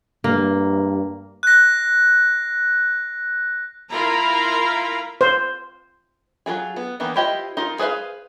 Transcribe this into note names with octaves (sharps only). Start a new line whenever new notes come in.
G2 A#3
F#6 A#6
E4 F4 A#4 F5 A#5 B5
C5
F#3 G#3 F4 G#4
B3
D#3 E3 A#3 B3
E4 F4 G4 C5 D#5
D#4 F4 A#4
G#4 B4 C5 E5 F5